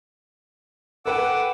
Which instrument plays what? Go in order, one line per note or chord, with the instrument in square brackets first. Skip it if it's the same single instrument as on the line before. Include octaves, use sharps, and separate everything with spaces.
[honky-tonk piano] A4 B4 G5 [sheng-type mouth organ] F#5 D6 E6